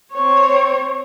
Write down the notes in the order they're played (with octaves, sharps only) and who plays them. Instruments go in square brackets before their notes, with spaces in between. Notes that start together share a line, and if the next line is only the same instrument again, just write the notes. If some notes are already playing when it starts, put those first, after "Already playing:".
[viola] C4 C#5